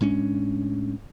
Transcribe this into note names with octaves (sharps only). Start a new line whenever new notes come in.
A2 G#3 C#4 D4